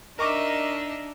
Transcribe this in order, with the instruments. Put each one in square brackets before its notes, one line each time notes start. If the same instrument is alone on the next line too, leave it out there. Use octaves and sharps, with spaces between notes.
[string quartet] D4 [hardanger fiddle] D#4 E5 [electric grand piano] A#4 C#6 D6 [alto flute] D#5